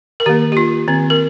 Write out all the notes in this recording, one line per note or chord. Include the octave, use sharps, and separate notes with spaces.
A#4
D#3 A#3 G4
G4
F4
D#3 C4
A#4